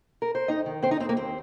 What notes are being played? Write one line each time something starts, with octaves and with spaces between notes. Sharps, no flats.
A#4
C5
F2 D#4 D#5
D#3
F2 C4 C5
D#4 D#5
F2 C4
A#3
D#2 C4